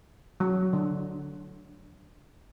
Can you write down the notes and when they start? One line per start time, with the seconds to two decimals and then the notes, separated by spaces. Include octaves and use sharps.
0.40 F#3
0.73 D3